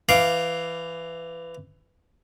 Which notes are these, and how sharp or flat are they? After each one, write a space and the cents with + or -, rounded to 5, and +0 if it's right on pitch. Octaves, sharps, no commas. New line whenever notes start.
E3 +20 F5 +0 D6 +0